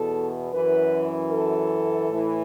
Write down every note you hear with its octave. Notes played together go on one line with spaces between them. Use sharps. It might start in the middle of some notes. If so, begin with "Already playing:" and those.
Already playing: E2 B2 A4
F#2 E3 B4
A4
A2 E3